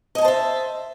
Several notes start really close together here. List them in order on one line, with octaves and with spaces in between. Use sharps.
D#5 G#5 A5 C5 E5